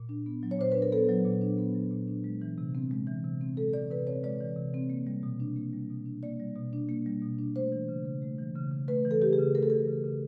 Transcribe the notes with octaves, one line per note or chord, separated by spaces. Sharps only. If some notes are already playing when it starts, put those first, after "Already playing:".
Already playing: A#2
D4
B3
F#3
C#5
A#2 C5
D4 B4
A#4
B3 A4
F#3
A#2
D4
B3
F#3
A#2
D4
G#3
E3
C3
C4
G#3
E3
C3
C4
G#3 A4
E3 D5
C3 B4
C4 C#5
G#3 D5
E3
C3
C4
A#3
G3
B2
D4
A#3
G3
B2
D4
A#3 D5
G3
B2
D4
A#3
G3
B2
D4
A3 C5
E3
C#3
C#3
A3
E3
C#3
C#3
A3 B4
E3
A4
C#3 G4
G#4
C#3
A3 A#4
A4
E3 A#4
C#3
C#3